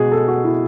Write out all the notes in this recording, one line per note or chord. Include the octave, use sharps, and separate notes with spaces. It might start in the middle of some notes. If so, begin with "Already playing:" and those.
Already playing: B2 G#3 F#4 G#4
A4
F#4
E4